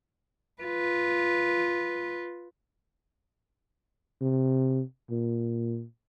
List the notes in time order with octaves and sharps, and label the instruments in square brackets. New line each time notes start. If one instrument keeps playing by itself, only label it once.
[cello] F4 B4
[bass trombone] C3
A#2